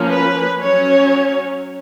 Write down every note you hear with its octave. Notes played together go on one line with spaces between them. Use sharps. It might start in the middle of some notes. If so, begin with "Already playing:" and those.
Already playing: F3 A#3 C#4
B4
F#3 C#4 C#5